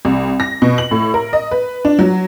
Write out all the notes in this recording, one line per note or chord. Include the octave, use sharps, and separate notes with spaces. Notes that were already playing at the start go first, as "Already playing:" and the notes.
C2
A#6
B2
F#7
A2
A#4
D#5
B4
D4
F#3